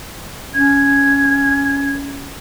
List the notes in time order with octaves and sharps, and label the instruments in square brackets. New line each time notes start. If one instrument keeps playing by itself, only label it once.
[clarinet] C#4 [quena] G#6